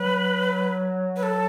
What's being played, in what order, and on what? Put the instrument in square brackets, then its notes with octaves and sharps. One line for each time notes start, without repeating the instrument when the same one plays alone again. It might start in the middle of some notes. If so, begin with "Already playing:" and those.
Already playing: [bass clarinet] F#3 [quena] B4
[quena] B4
A4